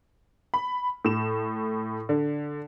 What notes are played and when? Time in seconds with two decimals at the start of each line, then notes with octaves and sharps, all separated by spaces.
0.54 B5
1.05 A2 E7
2.09 D3